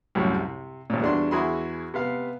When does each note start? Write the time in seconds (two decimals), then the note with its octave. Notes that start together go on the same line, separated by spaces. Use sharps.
0.15 C2 F#2 A2 C3 F#3
0.35 C3
0.90 G#1 A#2
1.02 E2 G3 D4 F#4 C6
1.31 E2 E4 F#4 G#4 B5 C6
1.94 C3 B3 F5